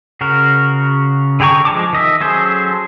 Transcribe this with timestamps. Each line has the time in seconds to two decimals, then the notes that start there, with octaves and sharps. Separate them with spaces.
0.21 C#3 F#4 A#4
1.40 D3 G#4 G5 A#5 C#6
1.65 F3 G#3 A5 D6
1.93 D#3 D#5 E5
2.21 F#3 C#4 G#4 A4 C5